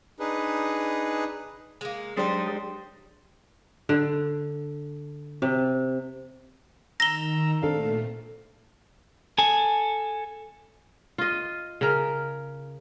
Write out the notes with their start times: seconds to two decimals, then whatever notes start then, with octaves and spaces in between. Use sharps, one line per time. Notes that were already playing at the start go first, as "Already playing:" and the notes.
0.19 D4 D#4 G#4 B4
1.81 G#3 A#3
2.17 F#3 G#3 D4 D#4 G4 G#4 C5 D5
3.89 D3
5.42 C3
7.00 D#3 A#5 E6 A#6 G7
7.62 A#2 A3 C4 D4 A4 F5
9.38 A4 G#5
11.18 F4 D#5
11.81 C#3 A#4